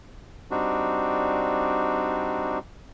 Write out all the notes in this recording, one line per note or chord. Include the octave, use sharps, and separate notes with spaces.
G3 C4 D4 D#4 F#4